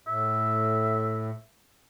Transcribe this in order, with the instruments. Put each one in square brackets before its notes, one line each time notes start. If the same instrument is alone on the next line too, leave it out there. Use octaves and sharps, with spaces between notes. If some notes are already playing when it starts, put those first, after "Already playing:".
[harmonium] A2 [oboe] E5